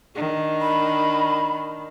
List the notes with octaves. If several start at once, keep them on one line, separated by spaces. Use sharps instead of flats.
D#3 D4
B5